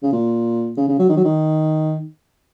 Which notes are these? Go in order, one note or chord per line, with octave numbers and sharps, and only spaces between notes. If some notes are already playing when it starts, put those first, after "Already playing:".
C#3
A#2
C#3
C#3
F#3
D#3
F#3
D#3